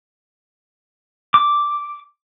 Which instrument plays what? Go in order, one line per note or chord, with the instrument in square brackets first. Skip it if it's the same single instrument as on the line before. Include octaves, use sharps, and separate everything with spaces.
[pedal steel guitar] D6